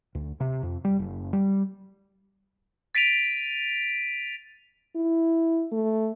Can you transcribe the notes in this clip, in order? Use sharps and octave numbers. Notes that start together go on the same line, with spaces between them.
D2
C3
F2
G3
F#1
G3
A6 B6 D7 D#7 F7
E4
A3